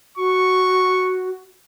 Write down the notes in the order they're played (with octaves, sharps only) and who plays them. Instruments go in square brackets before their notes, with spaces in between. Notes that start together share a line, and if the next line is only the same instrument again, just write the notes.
[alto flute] F#4 [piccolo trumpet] C#6